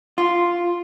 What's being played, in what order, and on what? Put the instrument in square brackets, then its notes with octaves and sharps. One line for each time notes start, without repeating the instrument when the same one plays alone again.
[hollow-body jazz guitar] F4